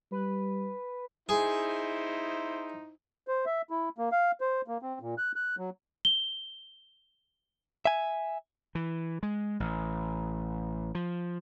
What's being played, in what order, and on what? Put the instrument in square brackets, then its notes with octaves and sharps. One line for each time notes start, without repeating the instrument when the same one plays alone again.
[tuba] G3 [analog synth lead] B4
[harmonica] D#4 E4 C5 [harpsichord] G#4
[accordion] C5
E5
E4
A#3
F5
C5
A#3
C4
A#2
F#6
F#6
F#3
[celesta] G7
[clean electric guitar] E5 G#5
[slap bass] E3
G#3
A1
F3